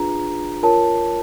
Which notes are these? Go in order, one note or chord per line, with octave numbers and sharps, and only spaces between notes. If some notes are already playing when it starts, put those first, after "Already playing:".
Already playing: D4 F4 G#4 B4 A#5
F4 A#4 C#5 A5